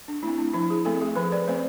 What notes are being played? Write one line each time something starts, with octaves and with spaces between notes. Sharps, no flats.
D4
A3 C4 E4
D4
F3 E4
G#4
A3 C4 A4
G#4
F3 B4
D5
A3 C4 C5